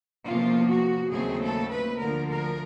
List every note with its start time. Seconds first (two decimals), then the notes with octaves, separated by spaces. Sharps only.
0.25 E2 C3 F3 A#3 C#4 F4
0.68 F#4
1.11 D#2 C#3 F#3 A3 C4 G#4
1.41 A4
1.69 B4
1.98 D2 D3 F3 A#4
2.27 A#4